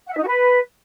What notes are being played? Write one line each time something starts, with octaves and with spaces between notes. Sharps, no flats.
F#5
E5
D#4
F#4
B4